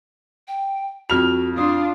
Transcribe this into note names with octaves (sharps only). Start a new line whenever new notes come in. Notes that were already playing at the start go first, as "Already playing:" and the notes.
G5
F2 F#4 F6 F7
D4 F4 D#6